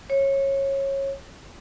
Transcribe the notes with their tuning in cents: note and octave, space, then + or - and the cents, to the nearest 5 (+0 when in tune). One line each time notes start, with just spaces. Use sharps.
C#5 -20